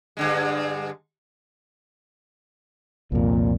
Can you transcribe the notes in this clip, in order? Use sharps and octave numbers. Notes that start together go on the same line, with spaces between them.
G2 D3 G#3
C2 F2 A#2